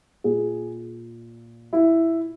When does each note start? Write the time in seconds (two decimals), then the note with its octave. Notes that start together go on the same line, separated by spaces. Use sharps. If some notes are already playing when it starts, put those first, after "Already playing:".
0.24 A#2 G#4
1.73 E4